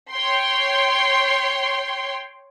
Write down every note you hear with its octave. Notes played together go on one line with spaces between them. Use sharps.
C#5 G5 C6